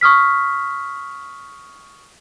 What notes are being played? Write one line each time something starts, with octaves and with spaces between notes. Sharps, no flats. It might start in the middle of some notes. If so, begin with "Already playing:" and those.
C#6 D#6 F6 B6